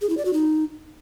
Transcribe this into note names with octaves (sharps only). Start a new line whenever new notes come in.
G#4
E4
D5
F#4
D#4